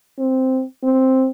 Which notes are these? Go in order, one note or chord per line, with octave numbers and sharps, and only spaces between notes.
C4
C4